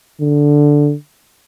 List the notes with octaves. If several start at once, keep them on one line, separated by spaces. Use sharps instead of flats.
D3